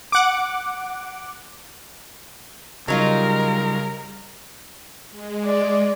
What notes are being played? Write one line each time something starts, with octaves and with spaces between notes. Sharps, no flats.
F#5 D6
C#3 F#3 G3 D#4 F4 A#4
G#3
D5